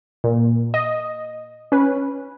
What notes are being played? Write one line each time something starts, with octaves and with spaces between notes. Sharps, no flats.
A#2
D#5
C#4 B4